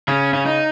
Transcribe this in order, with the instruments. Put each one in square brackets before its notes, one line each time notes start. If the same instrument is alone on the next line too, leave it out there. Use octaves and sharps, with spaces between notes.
[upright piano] C#3 [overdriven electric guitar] C#4
[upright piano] C#3 [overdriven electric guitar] C#4
[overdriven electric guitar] D#4